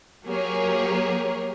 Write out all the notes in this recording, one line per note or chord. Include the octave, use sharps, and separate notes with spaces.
F#3 A#3 G4 G#4 A#4 C#5